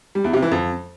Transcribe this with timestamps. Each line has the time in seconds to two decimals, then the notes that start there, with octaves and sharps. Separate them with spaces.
0.15 G3
0.24 E2
0.33 C3
0.42 E3
0.52 F2